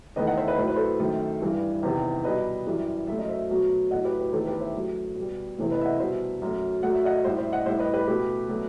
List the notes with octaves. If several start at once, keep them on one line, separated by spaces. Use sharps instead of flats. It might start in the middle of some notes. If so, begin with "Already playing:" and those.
E2 D#3 A3 B4 D#5
D#5 F#5
C5 E5
B4 D#5
A2 F#3 A3 C5
B4
A4 C5
F#2 D#3 A3
G2 E3 G3
E2 C3 D#3
B2 G3 B4 D#5
F#2 E3 G3
F#2 F#3 A3 E5
D#5
C5 E5
B2 F#3 A3
A2 F#3 A3 D#5 F#5
G4 B4
G4 B4
E2 D#3 A3 A4 C5
G4 B4
C5 E5
F#2 F#3 A3
B2 G3
E2 C3 E3 A3
B4 D#5
E5
D#5 F#5
B2 G3 C5 E5
F#2 F#3 A3
F#2 F#3 A3 F#5
E5
D#5 F#5
A2 G3 C5 E5
C5 E5
D#5 F#5
A2 G3 C5 E5
B4 D#5
G4 B4
B2 A3 G4 B4
B2 F#3 A3